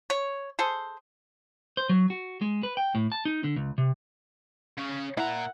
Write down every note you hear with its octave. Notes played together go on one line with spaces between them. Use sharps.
C#5
G#4 A4 C5
C5
F#3
F#4
G#3
B4
G5
A2
A5
D#4
D3
C#2
C3
C#3 C#4
A#2 E4 A#4 F#5 A#5